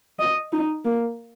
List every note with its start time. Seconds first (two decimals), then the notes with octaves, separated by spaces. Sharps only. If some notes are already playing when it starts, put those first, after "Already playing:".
0.19 D#5
0.52 D#4
0.85 A#3